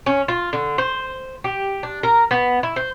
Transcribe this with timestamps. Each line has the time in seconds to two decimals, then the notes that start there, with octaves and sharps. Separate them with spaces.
0.06 C#4
0.28 F4
0.53 D3
0.78 C5
1.44 G4
1.83 D4
2.03 A#4
2.31 B3
2.63 E4
2.76 C5